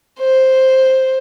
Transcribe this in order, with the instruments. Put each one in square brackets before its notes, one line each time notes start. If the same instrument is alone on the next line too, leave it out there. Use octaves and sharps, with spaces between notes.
[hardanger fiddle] C5